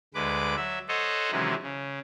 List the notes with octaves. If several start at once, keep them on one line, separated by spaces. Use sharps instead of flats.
D2 G#3 B4 D6
F#3 E5
A4 C5 C#5 D#5 F#5
C3 D#3 E3 F#3 G#3 C#4
C#3